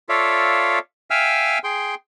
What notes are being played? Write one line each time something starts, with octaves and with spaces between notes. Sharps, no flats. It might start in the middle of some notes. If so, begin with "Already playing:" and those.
F4 A4 C#5 D5 E5 F5
E5 F5 G5 G#5 E6 F6
G#4 G5 C6